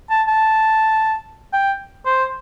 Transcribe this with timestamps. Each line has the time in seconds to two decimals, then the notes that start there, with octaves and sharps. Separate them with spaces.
0.10 A5
0.28 A5
1.53 G5
2.06 C5